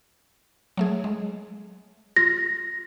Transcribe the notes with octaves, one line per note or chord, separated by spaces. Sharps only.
F#3 A3 G#4
G#3
F4 A#6